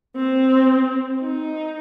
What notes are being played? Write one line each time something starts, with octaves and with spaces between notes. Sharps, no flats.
C4
D#4